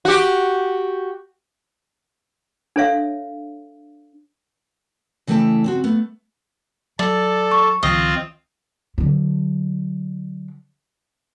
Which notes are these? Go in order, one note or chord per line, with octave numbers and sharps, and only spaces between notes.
F#4 G4
D4 A4 C#5 E5 F5
C#3 E3 A3 E4 G5 A5
C#3 C4 F#4
A3 B3
F#3 A4 D5
C#6
C#2 D#3 F3 C4 F4 D#5
D3 F#3